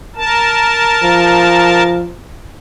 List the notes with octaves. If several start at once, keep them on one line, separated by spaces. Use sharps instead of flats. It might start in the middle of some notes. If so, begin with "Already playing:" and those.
A#4 A5
F3